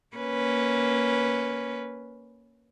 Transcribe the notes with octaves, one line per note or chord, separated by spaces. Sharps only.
A#3 C#4 B4